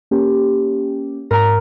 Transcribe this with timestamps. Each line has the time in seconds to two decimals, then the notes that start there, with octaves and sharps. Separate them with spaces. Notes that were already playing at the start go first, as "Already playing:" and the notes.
0.11 A#3 C#4 G4
1.31 G#2 A#4 A#5